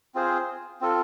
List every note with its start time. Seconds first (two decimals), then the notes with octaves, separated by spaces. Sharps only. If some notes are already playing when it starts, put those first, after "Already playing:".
0.15 C4 F4 G#4 C5
0.81 C4 F4 A4